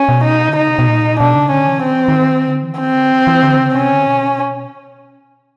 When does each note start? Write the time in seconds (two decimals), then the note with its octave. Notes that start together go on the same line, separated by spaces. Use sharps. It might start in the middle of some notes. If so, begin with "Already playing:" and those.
Already playing: C#4
0.09 B2
0.24 D#4
0.49 D3
0.56 C#3 D#4
0.68 C3
0.79 B2
0.88 A#2
1.20 B2 D4
1.35 C#3
1.51 D3 C#4
1.67 E3
1.83 D#3 C4
1.96 E3
2.08 D#3
2.47 D3
2.63 E3
2.79 D#3 C4
2.95 D3
3.11 E3
3.27 E3
3.43 D3
3.58 C#3
3.75 C3 C#4
3.91 D3
4.06 B2